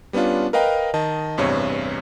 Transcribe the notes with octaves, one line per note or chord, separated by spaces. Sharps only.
G3 B3 C#4 D4 F4
A#4 B4 D#5 F5 G5 A#5
D#3 D#5 A5
A1 E2 G2 C3 C#5